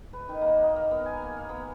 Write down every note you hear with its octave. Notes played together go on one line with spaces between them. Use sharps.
B4
D#3
A#3
D#5
F5
B3
G#5
A#3
F5
B3